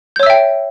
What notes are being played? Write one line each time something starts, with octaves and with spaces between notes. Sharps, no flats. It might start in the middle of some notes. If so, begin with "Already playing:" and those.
C#5 E5 G5 E6 G6